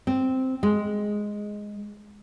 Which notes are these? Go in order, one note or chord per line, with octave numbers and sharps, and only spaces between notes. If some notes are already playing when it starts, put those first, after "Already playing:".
C4
G#3